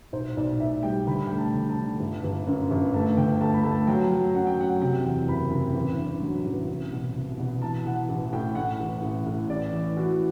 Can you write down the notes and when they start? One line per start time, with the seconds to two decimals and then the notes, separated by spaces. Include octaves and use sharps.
0.13 B1 C5
0.37 B1 D5
0.60 A2 E5
0.83 G3 G5
1.07 D2 B5
1.26 A3 G5
1.38 A5
1.53 D2
1.69 A5
1.77 D3
2.00 G1
2.24 G1
2.47 F#2
2.71 G1
2.94 A3 A5
3.17 D2 G5
3.41 A3 A5
3.53 B5
3.64 A3 A5
3.87 F#3 G5
4.12 F#3
4.34 F#2 F#5
4.47 G5
4.58 F#3 F#5
4.81 C3 G5
5.04 E2
5.28 F#1 B5
5.51 C3
5.75 A1
5.98 G2
6.22 F#3
6.46 A1
6.68 C2
6.92 B2
7.15 C2
7.39 B2
7.62 E3 A5
7.86 E3 F#5
8.09 A1
8.33 A2 G5
8.55 A2 F#5
8.80 A1
9.02 A1
9.26 A2
9.50 A1 D5
9.72 E3
9.97 E3 F#4